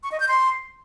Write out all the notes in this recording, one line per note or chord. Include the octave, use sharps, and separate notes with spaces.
C#6
D#5
G6
C6